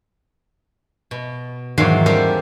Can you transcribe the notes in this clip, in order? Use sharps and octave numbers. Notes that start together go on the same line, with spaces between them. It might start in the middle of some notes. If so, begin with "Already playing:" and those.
B2
E2 G#2 D#3 F#3 F5 C6
G3 C#4 A4 A#4 C5 D5